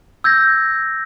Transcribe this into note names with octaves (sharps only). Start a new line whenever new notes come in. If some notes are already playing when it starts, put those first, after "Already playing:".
E6 G6 G#6 A#6